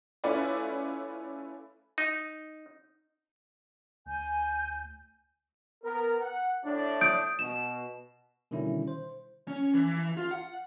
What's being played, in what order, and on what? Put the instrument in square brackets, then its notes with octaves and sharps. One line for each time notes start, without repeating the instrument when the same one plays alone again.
[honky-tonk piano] A3 C#4 E4 F4 B4 D5
[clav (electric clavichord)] D#4
[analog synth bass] D2 [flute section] G#5 G6
[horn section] B3 A#4
F#5
A2 D4
[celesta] D#6 G6 D7
[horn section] B2 [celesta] E7
[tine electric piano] B2 D3 D#3 G3 C#4 E4
C5
[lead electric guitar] C#4
E3
F4
F#5